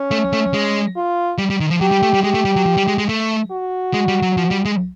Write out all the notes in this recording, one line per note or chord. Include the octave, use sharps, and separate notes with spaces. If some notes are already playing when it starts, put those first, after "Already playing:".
Already playing: C#4
A3
A3
G#3
F4
G3
G3
D#3
F3
F#3 G4
G3
A3
G3
G#3 G4
A3
G3
F#3
F3
G3
G#3
G#3
A3
F#4
G#3
G3
F#3
F3
G3
G#3